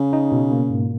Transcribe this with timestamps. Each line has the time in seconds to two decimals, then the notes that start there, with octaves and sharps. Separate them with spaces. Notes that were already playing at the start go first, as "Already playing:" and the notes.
Already playing: C#3
0.13 D#4
0.32 B2
0.51 A#3
0.70 G#2